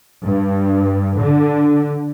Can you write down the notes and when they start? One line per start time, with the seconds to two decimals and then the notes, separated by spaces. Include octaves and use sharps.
0.24 G2
1.21 D3